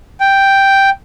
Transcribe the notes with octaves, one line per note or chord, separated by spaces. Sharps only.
G5